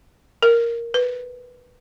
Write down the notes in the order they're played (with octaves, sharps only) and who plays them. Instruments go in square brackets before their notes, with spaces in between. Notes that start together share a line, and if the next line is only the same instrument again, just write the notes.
[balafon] A#4
B4